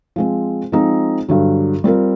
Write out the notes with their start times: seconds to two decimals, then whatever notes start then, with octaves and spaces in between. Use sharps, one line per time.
0.16 F3 G#3 C4
0.72 F3 G#3 C4 D#4
1.29 G2 D3 F#3
1.84 G3 C4 F4 A#4